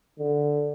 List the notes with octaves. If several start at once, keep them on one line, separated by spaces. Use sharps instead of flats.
D3